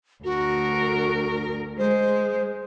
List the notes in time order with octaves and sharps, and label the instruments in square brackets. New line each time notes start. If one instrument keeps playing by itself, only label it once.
[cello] D2 A#4 [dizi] F#4
[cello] G#3 [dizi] C5